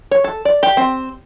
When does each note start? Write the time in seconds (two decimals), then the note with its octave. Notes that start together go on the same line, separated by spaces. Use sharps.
0.11 C#5
0.24 A4
0.45 D5
0.63 G4
0.77 C4